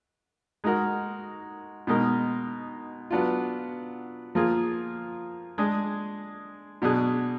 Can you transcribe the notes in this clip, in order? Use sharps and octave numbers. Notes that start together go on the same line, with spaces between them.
G#3 D#4 F#4 A#4
B2 G#3 D#4 A#4
F#3 B3 D4 F4
F3 A#3 F4 G#4
G#3 D4 G#4
B2 F#3 D4 G#4